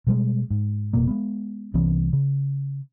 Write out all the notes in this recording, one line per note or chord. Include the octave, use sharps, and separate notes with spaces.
B2 G3 G#3
G#2
F1 B2 A#3
G#3 A3 B3
C2 E3 B3 C#4
C#3